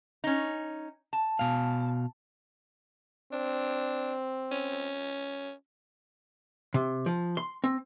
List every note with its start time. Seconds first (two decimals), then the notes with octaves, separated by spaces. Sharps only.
0.24 C#4 D#4
1.13 A5
1.39 B2 F5
3.33 C4 D4
4.52 C#4
6.74 C3
7.06 F3
7.37 C6
7.64 C4